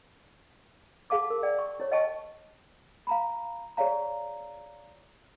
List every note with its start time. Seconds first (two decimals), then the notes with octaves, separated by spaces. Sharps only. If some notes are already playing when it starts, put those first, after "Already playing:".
1.10 G#4 F5 A5 D6
1.30 A#4
1.43 D5 G5
1.59 C#6
1.80 E4 C#5
1.92 D#5 G5 A5 C#6
3.07 F5 A#5 B5
3.77 G#4 C#5 D5 F5 A#5